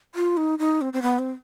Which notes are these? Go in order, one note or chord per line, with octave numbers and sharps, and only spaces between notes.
F4
D#4
D#4
C4
C4
B3
C4